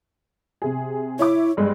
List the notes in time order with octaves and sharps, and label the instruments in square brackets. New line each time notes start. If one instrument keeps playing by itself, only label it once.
[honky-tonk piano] C3 G#4
[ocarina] E4 [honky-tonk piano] C#5 E5 D6
[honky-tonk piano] G2 G#3